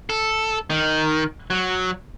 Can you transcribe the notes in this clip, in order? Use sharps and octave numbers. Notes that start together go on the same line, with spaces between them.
A4
D#3
F#3